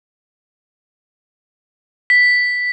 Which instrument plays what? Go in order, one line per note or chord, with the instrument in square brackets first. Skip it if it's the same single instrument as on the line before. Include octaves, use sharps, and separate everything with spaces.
[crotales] B6